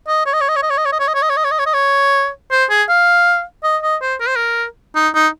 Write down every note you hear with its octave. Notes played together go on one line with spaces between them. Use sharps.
D#5
C#5
D#5
C#5
D#5
C#5
D#5
C#5
D#5
C#5
D#5
C#5
D#5
C#5
D#5
C#5
D#5
C#5
D#5
C#5
D#5
C#5
C5
G#4
F5
D#5
D#5
C5
A#4
C5
A#4
D#4
D#4